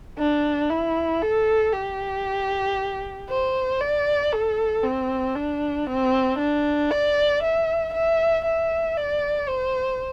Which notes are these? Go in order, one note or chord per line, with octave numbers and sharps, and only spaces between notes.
D4
E4
A4
G4
C5
D5
A4
C4
D4
C4
D4
D5
E5
E5
E5
D5
C5